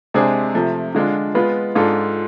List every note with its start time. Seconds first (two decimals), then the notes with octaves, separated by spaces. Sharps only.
0.14 C3 G#3 D4 G#4 C5
0.55 C3 F3 A3
0.95 D3 G#3 D4 F4
1.35 G#3 B3 F4 B4
1.75 G#2 G#3 D4 F4 A4